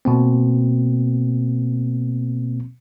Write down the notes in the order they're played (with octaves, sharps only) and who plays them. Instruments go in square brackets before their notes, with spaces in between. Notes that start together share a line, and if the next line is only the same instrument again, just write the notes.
[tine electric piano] B2 A#3 C4